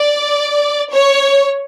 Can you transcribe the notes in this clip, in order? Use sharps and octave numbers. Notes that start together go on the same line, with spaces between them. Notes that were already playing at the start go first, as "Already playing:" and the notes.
Already playing: D5
C#5